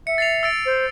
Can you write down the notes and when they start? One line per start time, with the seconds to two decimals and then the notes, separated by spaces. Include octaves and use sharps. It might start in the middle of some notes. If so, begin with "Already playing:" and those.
0.07 E5 C#7
0.18 A6 C7 F7
0.43 E6 A6 D7
0.66 C5